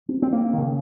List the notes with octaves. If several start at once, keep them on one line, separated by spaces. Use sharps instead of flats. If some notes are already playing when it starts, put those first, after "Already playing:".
C4
C4
A#3
D#3
C#3